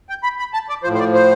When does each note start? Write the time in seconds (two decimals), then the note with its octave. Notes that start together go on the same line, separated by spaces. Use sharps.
0.09 G5
0.23 B5
0.39 B5
0.54 A5
0.69 D5
0.83 F3 C5
0.88 A2
0.94 C5
0.99 D5
1.14 C5